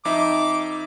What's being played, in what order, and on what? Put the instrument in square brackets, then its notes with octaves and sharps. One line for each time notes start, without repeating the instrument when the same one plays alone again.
[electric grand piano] F2 D#4 E5 [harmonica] D6